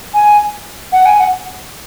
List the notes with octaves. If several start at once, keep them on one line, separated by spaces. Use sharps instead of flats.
G#5
F#5
G#5
F#5